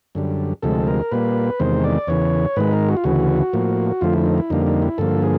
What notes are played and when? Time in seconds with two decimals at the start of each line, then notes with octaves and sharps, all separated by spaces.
0.15 F#2 D3 G3
0.62 D2 C3 F3 G#3 A4
0.87 A#4
1.11 A#2 G3 A#3 B4
1.60 E2 C3 D#3 G#3 C5
1.84 D5
2.07 E2 C#3 E3 C#5
2.56 G#2 D#3 G#3 B4
2.73 A#4
2.89 F#4
2.97 F4
3.04 D2 C#3 E3 F#4
3.53 A2 F3 A#3
4.01 F2 D3 F3 A3 F4
4.13 E4
4.26 D#4
4.38 E4
4.50 F2 D3 G3 A#3 D#4
4.67 D#4
4.82 E4
4.98 G2 D3 F3 A#3 A4
5.23 G#4